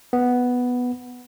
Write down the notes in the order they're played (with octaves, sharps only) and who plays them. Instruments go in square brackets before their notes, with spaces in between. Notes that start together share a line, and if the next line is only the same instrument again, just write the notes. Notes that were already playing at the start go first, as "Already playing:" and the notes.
[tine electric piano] B3